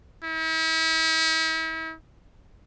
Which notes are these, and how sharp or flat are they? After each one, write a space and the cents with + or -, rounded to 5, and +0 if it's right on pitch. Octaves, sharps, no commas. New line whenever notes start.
E4 -40